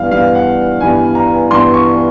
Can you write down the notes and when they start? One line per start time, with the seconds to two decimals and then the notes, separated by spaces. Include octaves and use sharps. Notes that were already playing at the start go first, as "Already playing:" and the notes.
Already playing: G2 E3 G3 B3 F5
0.11 G2 E3 G3 B3 F5
0.35 F#5
0.80 G2 E3 G3 B3 G#5
1.15 A#5
1.51 G2 E3 G3 B3 C6
1.74 C#6